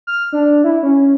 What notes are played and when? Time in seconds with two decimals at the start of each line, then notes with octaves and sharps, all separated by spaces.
0.07 F6
0.32 D4
0.64 E4
0.83 C#4